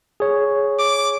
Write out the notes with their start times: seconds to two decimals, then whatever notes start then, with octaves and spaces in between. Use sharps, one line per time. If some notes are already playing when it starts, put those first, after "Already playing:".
0.20 G#4 C#5
0.80 D6